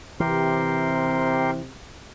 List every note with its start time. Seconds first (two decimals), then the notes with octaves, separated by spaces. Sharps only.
0.20 C3 E3 G4 A#4 C6